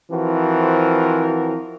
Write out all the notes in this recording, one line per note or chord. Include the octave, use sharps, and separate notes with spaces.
E3 F3 C4 F#4 A#4